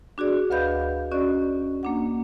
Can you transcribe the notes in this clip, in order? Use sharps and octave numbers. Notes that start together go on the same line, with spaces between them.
D4 F#4 G#4 D5
D2 B4 D#5 F5 B5 G6
C#4 F#4 D5 D#5
A#3 D4 F#5